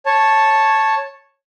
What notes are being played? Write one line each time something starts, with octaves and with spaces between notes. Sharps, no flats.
C#5 A5